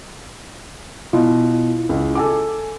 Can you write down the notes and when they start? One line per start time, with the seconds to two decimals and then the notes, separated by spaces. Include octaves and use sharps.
1.13 B2 E4 F4
1.89 C#2
2.15 A4 G#5 D6